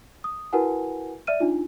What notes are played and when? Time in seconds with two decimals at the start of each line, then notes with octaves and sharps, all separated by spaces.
0.24 D#6
0.53 E4 F#4 A#4 B4 F#5 G#5
1.27 D5 E5 F6 D#7
1.40 D4 D#4 F4